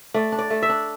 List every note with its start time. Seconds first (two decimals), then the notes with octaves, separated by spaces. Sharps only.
0.14 A3 D5
0.32 D4
0.39 D5
0.50 A3
0.63 E5
0.69 D4